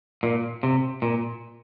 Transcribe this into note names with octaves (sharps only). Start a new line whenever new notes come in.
A#2
C3
A#2